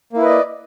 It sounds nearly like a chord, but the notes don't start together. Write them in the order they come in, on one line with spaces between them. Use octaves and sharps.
A#3 E4 B4 D#5 D5